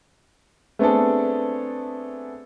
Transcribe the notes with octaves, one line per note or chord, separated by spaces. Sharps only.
A3 B3 C4 D4 G#4 A4